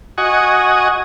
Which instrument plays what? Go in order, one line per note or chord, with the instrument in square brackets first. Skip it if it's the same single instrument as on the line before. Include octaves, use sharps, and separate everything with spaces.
[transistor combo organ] F#4 D#5 F#5 G#5 C#6 D#6